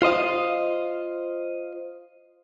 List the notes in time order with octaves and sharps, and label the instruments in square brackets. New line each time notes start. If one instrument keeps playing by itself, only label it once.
[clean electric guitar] F4 C5 D#5 F5